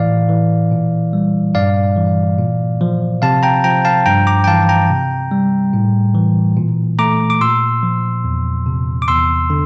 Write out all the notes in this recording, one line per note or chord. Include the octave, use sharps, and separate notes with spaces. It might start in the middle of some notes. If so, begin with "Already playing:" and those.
Already playing: A2 E3 D5 F5
E3
A#2
G3
G2 D5 F5
E3
A#2
F3
C3 F5 A5
G5 A#5
F3 G5 A#5
F5 A5
G2 G5 A#5
A#5 D6
G5
E3 F5 A5
G5 A#5
C3
G3
A2
E3
A#2
A3 A#5 D6
D6
A#2 C6 E6
F3
E2
C3
D6
E2 C6 E6
D3